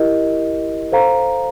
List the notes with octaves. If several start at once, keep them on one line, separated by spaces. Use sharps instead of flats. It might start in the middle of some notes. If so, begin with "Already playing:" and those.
Already playing: E4 G4 A#4 D#5
A4 C5 F5 A#5